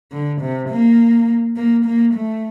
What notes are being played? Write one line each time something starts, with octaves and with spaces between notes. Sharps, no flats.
D3
C3
A#3
A#3
A#3
A3